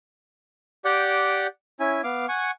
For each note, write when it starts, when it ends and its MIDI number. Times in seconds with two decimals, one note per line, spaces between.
0.85 1.47 67
0.85 1.47 74
0.85 1.47 78
0.85 1.47 79
1.80 2.01 61
1.80 2.01 64
1.80 2.01 80
2.04 2.26 59
2.04 2.26 77
2.04 2.26 86
2.29 2.51 78
2.29 2.51 80
2.29 2.51 85